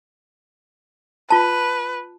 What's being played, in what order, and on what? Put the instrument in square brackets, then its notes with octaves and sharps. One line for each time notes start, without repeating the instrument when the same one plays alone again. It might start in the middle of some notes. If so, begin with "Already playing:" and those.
[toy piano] F4 A5 [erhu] B4